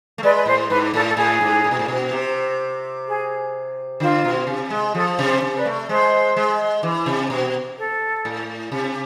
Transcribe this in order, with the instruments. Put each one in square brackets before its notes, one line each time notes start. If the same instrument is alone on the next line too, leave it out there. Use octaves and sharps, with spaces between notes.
[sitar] A3
[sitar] G#3 [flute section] B4 D5
[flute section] B4
[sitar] A2 [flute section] C5
[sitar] G#2 [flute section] B4
[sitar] A2 [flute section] A4
[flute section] A4
[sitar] A2 [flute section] G#4
[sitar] G#2
A2
B2
A2
B2
C3
[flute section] G#4
[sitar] D3 [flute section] F4
[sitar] B2
C3
G#3
[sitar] F3 [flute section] A4
[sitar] C3
[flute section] C5
[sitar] C3
[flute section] B4 D5
[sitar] A3
[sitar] G#3 [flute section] C5
[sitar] G#3
E3
C3
B2
[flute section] A4
[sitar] A2
C3